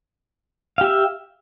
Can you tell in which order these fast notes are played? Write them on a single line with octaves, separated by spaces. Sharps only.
F5 G4 E5